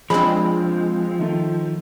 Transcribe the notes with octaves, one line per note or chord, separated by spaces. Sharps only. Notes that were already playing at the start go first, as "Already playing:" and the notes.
F3 G#3 C4 D4 B5
D#3 A3